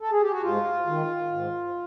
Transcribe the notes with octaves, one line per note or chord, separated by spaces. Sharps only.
A4
G#4
G4
F#4
G#2 F4
D#3
G#2